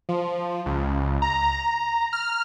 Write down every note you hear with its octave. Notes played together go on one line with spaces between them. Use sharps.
F3
C#2
A#5
A#5
F6